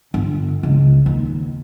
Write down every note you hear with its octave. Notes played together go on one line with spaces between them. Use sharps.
G1
C#2
D#2